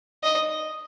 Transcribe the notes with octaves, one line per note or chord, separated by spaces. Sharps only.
D#5